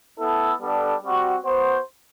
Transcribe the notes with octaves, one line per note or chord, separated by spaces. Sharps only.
B3 E4 A4
G3 B3 D4 A4
G3 C4 F#4
B3 F#4 C5